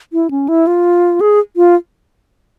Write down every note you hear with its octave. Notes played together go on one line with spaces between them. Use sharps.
E4
C#4
E4
F4
G#4
F4